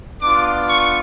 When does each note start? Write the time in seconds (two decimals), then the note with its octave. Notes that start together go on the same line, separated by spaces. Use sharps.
0.21 B3 D4 F4 D6
0.68 C#6